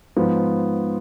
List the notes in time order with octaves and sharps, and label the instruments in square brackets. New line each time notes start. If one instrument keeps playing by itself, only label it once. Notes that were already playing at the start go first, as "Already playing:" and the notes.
[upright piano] G#2 F3 B3